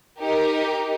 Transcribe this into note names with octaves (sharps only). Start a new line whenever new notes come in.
D#4 G4 A#4